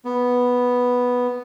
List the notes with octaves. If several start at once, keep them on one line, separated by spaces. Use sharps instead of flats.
B3